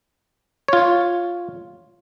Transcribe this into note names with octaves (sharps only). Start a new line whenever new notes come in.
F4 C#5